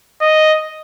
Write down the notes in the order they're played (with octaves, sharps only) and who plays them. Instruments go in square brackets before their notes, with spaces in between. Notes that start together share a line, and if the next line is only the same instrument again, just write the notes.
[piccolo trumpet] D#5